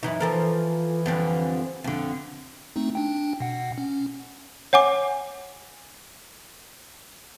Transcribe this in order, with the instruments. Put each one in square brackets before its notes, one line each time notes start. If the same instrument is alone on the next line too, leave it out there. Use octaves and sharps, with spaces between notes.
[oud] F#2 E3 D#4
[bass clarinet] E3 [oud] F3 A4 A#4
[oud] F2 D3 G3
F2 D3
[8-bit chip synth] A3 C4 D#4
D4 G5
B2 F#5
C#4
[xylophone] C#5 F#5 G#5 D6